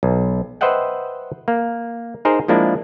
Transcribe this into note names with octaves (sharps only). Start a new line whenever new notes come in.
B1
B4 C5 D#5 E5 F#5 G5
A#3
D#4 G#4 A#4 C5
F3 G#3 A#3 D4 E4